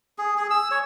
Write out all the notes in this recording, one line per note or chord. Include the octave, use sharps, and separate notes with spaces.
G#4
G#4
E6
C#5